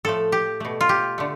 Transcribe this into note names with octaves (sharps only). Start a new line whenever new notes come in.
A2 F3 A3 A4
G4
B2 A3
F4
G4
D3 A3